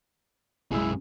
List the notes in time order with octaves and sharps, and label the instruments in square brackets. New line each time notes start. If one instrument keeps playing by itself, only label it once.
[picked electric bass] B1 G#3 [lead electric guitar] F#2 G#4 [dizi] E4